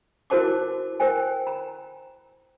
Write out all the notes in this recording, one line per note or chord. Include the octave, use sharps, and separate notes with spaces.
E4 F#4 A#4 C5 A5 D6
A#4 C5 G5 G#5
A#5